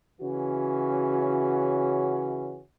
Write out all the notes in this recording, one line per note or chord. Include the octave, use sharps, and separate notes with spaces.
C#3 E3 C#4 F#4